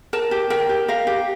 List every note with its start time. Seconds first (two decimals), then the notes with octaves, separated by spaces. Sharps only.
0.13 A#4 A5
0.31 G4
0.50 A#4 G5
0.69 G4
0.88 A#4 F5
1.07 G4